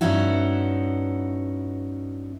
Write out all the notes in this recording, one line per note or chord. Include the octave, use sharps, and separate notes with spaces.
G2 B3 C#4 D#4 E4 F#4